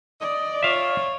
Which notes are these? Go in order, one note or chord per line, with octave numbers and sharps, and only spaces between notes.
D5 D#5
F4 C#5 E5 F5